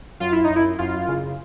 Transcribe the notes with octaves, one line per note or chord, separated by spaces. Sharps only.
F#2 F4
E4
D#4
F#2
E4
F#2 F4
C#3